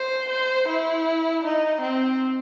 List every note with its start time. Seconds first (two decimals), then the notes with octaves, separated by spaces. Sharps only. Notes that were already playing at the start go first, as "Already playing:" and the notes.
Already playing: C5
0.30 C5
0.68 E4
1.43 D#4
1.82 C4